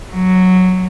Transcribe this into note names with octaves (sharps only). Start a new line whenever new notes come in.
F#3